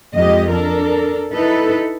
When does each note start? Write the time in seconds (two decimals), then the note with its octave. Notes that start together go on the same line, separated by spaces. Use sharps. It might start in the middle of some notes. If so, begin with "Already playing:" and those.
0.17 F2 G#3 G4 D#5
0.51 D4 A4 A#4
1.34 D#4 E4 A4 B4